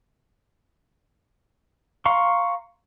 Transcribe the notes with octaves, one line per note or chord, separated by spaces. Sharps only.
F5 A#5 C6 C#6